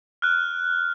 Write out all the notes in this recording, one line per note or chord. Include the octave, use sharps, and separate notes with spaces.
F6 F#6